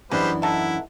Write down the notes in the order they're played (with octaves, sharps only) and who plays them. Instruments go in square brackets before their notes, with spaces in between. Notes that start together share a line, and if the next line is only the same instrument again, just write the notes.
[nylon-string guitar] F#2 E3 D4 [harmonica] G3 B4 C5 [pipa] G#3 [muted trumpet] B3
[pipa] D#4 A4 E5 [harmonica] E4 [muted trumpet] F#5